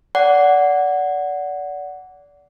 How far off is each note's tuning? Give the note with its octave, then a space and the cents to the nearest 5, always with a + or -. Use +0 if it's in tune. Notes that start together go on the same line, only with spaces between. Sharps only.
D5 -25 F#5 +0